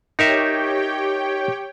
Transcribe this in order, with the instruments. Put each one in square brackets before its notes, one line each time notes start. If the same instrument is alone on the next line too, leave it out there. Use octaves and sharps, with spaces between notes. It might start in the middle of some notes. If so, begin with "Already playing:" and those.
[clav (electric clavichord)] D#4 A#4 E5 [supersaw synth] G4 C#5 G5